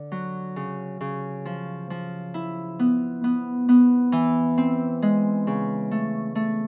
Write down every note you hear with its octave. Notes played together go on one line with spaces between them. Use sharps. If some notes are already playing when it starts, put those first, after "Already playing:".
Already playing: D3
F#3
C#3
C#3
F3
F3
E4
B3
B3
B3
E3
C4
G#3
C#3
A3
A3